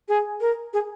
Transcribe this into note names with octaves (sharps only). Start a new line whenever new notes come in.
G#4
A#4
G#4